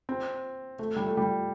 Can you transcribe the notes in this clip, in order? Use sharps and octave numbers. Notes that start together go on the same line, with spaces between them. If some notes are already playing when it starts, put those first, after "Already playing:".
C4
A3
G3
A3
G3